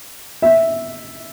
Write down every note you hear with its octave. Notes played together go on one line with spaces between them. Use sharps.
E5